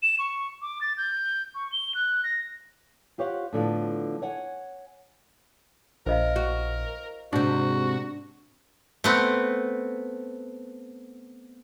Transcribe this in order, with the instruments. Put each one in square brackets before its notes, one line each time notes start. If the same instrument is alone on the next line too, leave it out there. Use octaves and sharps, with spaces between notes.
[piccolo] E7
C#6
D6
A6
G6
C#6
G7
F#6
A#6
[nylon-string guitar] F4 G4 C5 C#5 F5 F#5
A2 D3 F3 B3
C#5 F#5 G#5
[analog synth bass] A#1 [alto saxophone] A#4 [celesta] C5 D#5 F5
[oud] F#4
[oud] G#2 C3 [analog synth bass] D4 [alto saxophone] F#4
[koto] A3 B3 C4